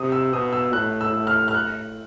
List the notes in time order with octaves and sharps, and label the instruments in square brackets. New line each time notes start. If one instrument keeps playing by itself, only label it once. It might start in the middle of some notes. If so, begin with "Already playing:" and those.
Already playing: [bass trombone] C3 [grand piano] D#6
[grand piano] E6
[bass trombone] B2 [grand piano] D#6
[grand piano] E6
[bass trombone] A2 [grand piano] F#6
[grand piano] E6
[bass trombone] A2
[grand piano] F6
F6
[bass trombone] A2 [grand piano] F#6